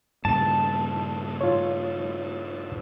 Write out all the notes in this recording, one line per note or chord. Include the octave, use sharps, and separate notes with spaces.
G2 A#2 C#3 A5
F4 C#5